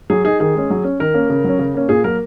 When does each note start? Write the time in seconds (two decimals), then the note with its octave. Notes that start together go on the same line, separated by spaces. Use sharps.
0.10 F#3 G#4
0.25 D#4 G#4
0.40 D#3 G#4
0.55 G#3 C#4
0.70 F#3
0.84 C#4
1.00 D#3 A#4
1.14 A#3 C#4
1.30 C#3
1.44 F#3 C#4
1.59 C#3
1.74 A#3 C#4
1.89 A#2 G#4
2.04 F#3 A#3 A#4